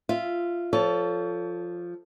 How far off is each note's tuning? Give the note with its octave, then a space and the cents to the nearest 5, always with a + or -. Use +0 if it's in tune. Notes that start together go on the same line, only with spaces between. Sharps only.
F4 -10 E5 +0
F3 +0 A4 +0 C#5 +30